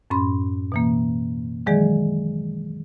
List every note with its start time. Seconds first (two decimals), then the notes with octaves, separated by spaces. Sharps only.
0.10 F#2 A2 C#4 B5 C6
0.72 B2 E3 A#3
1.66 D#3 E3 F#3 G#3 G#4 D5